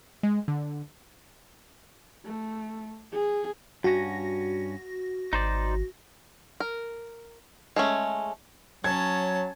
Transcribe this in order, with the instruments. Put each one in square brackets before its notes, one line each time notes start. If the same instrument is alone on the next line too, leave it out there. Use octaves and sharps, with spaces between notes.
[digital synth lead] G#3
D3
[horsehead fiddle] A3
G#4
[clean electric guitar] G2 C#4 [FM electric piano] F#4 A#6
[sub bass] G#1 [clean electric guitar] D#4 C5 D5
[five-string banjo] A#4
G#3 A3 C#4
[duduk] F#3 [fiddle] C#4 A5 [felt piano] G#6